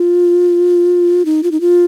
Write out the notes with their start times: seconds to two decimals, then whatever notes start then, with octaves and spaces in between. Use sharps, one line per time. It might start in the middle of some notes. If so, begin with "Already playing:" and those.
Already playing: F4
1.25 D#4
1.43 F4
1.51 D#4
1.61 F4